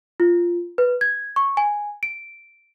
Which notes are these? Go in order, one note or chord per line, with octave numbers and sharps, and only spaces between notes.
F4
B4
G#6
C#6
G#5
D7